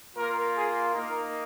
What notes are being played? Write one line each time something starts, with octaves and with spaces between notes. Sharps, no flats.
A#3 F4 A#4
G#4
A#3 D#4 A#4